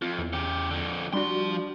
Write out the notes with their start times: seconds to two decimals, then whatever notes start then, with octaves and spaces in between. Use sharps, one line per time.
0.02 F2 F4
0.18 E2
0.33 C#3 G4
0.70 F2 D3
1.13 F3 G3 D4 F#4 C6